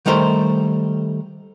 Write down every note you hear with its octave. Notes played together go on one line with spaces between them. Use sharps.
D#3 G3 A3 A#4 C5